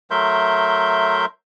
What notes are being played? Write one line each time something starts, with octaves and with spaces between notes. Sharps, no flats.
F#3 A3 A#4 E5 C6 G6